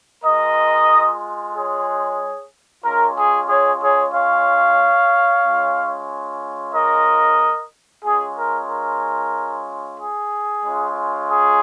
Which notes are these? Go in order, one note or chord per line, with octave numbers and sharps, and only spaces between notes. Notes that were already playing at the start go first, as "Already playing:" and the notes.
G#3 F4 A#4 D#5
G#4 C#5
G#3 C#4 F4 A#4
G#4
G#4 C#5
G#4 C#5
C#5 F5
G#3 C#4 F4
A#4 D#5
G#3 C#4 F4 G#4
A#4
A#4
G#4
G#3 C#4 F4
G#4